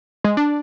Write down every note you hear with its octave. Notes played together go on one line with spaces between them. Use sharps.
G#3
D4